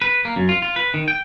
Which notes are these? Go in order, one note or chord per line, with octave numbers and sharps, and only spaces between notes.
B4
A#3
F#2
F4
F4
B4
D#3
G5